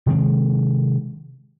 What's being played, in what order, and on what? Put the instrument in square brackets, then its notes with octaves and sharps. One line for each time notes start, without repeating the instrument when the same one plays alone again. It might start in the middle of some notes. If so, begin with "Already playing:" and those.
[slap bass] C3 D#3 G#3 C4